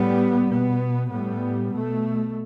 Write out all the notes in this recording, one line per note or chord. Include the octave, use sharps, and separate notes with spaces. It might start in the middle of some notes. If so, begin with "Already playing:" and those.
Already playing: A2 G3 B3
B2 B3
A2 G3 B3
B2 A3